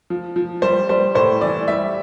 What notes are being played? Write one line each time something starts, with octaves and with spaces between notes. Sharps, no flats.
F3
F3
G3 C5
G3 C5
A2 C5
E3 D5
G3 E5